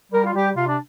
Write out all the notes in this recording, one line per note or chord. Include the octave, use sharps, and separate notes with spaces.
G3 A#4
F4
G3 G4
C3 F4
D4